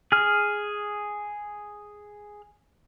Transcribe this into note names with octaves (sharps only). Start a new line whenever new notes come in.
G#4 F6